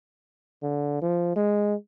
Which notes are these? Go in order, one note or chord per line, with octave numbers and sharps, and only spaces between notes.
D3
F3
G#3